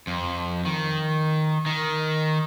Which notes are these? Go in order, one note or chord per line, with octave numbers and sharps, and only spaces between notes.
F2
D#3
D#3